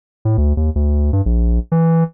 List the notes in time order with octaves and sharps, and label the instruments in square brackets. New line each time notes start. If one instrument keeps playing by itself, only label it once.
[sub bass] A2
D2
D#2
D2
G2
A#1
E3